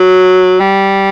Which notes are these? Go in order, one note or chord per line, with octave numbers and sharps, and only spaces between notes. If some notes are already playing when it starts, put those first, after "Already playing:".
Already playing: F#3
G3